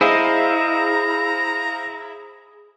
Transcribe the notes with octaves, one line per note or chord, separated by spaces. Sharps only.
E4 G#4 C5 D#5 F5 A#5